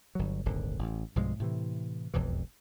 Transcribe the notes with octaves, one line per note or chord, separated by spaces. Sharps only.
G1 F#3
D#1 G#1 D3
A1
B1 G2 F3 G#3
A2 C3 E3
E1 B1 F2 E3